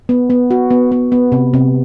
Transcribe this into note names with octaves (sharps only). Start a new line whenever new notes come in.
B3
B3
F#4
B3
B3
B3
C3
C3